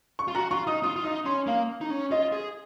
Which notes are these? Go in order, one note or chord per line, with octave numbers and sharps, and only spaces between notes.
C#6
F4
F#4 A#5
F4 C#6
D#4 D#6
F4 D#6
F4
D#4 D#6
C#4 C6
A#3 F5
D#4
C#4
F4 D#5
G#4